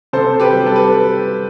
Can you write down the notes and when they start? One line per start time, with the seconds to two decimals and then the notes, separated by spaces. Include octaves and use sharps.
0.13 C3 A4 C5
0.40 G4 B4
0.53 G3
0.66 A4
0.76 B4